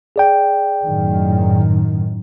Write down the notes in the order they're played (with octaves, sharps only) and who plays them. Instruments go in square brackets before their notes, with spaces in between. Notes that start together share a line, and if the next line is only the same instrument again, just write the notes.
[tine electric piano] G#4 D5 G5
[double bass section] F#2 A2 D#3